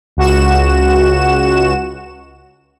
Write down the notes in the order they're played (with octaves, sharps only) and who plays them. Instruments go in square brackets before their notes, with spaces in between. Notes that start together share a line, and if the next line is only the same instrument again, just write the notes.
[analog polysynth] C#2 F#4 E7